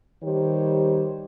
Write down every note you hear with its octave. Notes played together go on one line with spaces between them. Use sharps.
D#3 G3 G4 C5 C#5